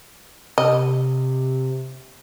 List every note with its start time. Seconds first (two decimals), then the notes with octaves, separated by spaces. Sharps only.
0.58 C3 D#5